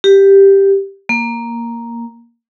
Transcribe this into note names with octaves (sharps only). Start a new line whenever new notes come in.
G4
A#3